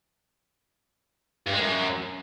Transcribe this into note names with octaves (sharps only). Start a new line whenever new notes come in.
G2
G#3
F#2